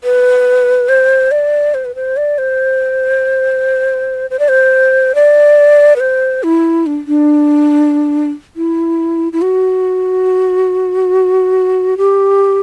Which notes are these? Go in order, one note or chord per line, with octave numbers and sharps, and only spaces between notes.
B4
C5
D5
C5
B4
C5
D5
C5
C5
D5
C5
D5
B4
C5
E4
D4
D4
E4
E4
F#4
G4